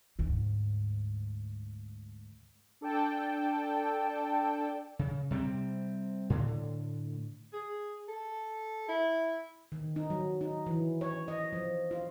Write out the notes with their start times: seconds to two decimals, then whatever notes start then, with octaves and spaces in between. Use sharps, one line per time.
0.19 D2 G#2
2.81 D4 A4 D5 G5 A5
4.99 C#3
5.31 C3 G3 A3 C4
6.30 A2 D3
7.53 G#4
8.08 A4
8.89 E4
9.72 D#3
9.96 D#4
10.10 F#3
10.41 D#4
10.66 E3
11.01 C#5
11.28 D#5
11.53 F3
11.91 F4